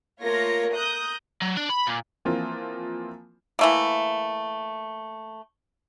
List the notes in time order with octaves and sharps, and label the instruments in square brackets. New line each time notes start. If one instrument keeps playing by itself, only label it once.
[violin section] A3 A#3 F4 A#4 C#5 A#6
A#5 D#6 F#6 G6
[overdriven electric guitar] F#3
D4
B5
A#2
[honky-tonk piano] E3 F3 A#3 C4 F4
[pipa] E3 A3 A#3